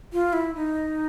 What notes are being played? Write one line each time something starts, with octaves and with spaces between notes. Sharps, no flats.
F4
E4
D#4